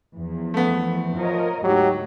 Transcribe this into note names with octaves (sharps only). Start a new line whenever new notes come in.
E2 F3
A3 B3
F3 A#4 C#5 D#5
D2 G#2 F#3 D#4 G4